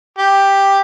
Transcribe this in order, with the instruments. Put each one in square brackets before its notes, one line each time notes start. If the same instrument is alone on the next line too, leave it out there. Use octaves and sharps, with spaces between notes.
[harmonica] G4